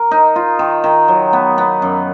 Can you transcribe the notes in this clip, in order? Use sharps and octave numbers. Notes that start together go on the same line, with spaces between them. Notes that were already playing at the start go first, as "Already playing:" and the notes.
Already playing: A#4
D#4
F4
D#3
D#3
F#3
B3
B3
F#2